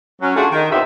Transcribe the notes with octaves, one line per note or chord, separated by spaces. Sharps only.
F#3 C#4
A3 D4 F4 F#4 G#4
D#3
E2 B2 D#3 C4 D#4 E5